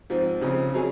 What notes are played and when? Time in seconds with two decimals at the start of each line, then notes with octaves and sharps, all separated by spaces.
0.10 G#2 F3 C4
0.41 C#2 C#3 F3 C4
0.74 F#3 C#4 G#4